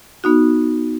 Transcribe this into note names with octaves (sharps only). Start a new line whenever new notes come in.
B3 D#4 F#4